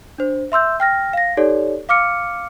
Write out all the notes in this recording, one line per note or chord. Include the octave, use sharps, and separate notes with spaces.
D4 C5
E5 C6 E6 G6
G5 F6 A#6
F5 A#6
D#4 G4 A4 C#5 D5
F5 D6 F6 C#7